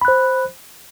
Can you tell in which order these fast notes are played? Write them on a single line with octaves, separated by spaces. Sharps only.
B5 F#6 C5